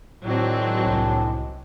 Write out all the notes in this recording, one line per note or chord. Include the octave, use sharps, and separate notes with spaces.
A2 D#3 F#3 G#3 C4 D4
C2